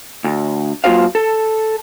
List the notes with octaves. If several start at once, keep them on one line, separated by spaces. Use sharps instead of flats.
D2
F#3 A#3 F4 F#4 C5 F5
A4